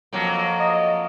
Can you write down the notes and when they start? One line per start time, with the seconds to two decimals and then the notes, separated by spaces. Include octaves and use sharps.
0.13 F2 F#3 A#3
0.60 D#5